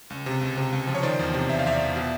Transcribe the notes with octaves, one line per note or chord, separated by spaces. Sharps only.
C#2
C3
C#2
C3
C#2
F3
C#5
D#3 C5 D5
E2
C3
E2 E5
F5
E2 D5 E5
E2
B2